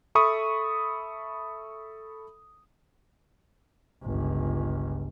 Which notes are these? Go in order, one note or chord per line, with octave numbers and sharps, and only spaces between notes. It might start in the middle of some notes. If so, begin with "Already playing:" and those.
A4 E5 B5 C#6 D#6
G1 C#2